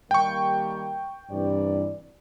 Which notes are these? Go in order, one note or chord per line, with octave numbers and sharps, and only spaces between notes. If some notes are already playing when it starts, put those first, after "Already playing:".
D#3 G3 A#3 G5 C#6
G2 C3 E3 D5